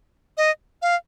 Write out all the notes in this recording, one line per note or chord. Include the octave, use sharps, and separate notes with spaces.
D#5
F5